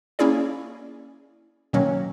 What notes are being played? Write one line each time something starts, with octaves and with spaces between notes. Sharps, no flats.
A#3 C#4 E4 G#4 D5
B2 D#3 F#3 A#3 C#4